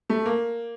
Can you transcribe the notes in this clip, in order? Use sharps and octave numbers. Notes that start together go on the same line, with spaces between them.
A3
A#3